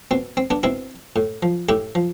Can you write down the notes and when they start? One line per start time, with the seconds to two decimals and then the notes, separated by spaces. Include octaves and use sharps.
0.11 B2 C4
0.37 C4
0.50 B3 D4
0.63 B2 C4 E4
1.16 A2
1.43 F3
1.69 A2 E4 G4
1.95 F3